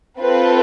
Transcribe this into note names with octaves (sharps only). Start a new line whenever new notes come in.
C4 F4 A4 B4